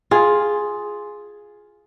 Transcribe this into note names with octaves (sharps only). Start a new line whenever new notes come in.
F4 G#4